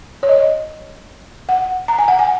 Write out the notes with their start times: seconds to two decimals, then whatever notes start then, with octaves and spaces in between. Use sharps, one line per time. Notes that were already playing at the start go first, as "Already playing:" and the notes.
0.23 C#5
0.29 D#5
1.49 F#5
1.88 A#5
1.99 G#5
2.08 F#5
2.19 G#5